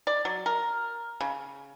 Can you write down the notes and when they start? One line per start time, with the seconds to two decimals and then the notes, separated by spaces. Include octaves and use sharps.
0.07 D5
0.25 F#3
0.46 A#4
1.21 C#3